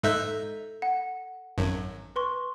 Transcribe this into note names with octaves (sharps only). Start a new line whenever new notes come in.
G#2 D#4 A4 E5 F#6 G6
F#5
G#1 F#2
B4 C6 C#6